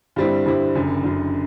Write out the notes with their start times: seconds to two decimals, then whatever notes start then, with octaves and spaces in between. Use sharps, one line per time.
0.16 G2 D3 G3 C4 E4
0.46 G2 D3 G3 C4 E4
0.75 F#1 F#2 D3
1.04 F#1 F#2 D3